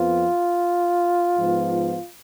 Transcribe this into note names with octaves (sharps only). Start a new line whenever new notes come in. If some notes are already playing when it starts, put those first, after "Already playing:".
Already playing: F2 F3 B3 F4
G#2 F3 B3